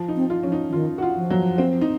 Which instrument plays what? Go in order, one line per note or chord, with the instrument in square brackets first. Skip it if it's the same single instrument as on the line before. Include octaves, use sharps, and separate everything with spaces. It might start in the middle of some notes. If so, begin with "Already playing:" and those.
Already playing: [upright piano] F3
D#4
[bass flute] C4
[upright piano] F4
[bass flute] F3 [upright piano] C#4
[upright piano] D#4
[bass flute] F3
[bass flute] D#3 [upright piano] F4
[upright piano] F#4
F4
[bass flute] F3
[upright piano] F#3
C4
D#4